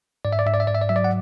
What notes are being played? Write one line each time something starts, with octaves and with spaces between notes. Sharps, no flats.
G#2 D5
E5
D5
G#2 E5
D5
E5
G#2 D5
E5
D5
F#3 E5
D5
F#5